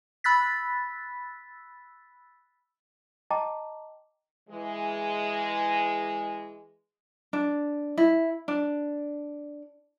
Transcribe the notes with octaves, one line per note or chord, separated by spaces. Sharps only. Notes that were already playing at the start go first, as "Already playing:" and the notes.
B5 E6 F#6 A6 B6
D#5 G5 A5 A#5 D6
E3 G#3
D4
E4
D4